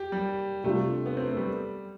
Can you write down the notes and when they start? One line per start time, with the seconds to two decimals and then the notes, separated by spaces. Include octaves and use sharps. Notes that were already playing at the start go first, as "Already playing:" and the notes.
Already playing: G4
0.12 G3
0.64 C3 G3 A3 D4 F4
1.06 B3
1.17 C4
1.27 A3
1.37 G3